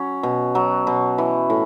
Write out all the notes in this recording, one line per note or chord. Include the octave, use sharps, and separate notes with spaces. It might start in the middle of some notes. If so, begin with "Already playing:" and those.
Already playing: F#3 C#4
B2
F#3
B2
E3
A2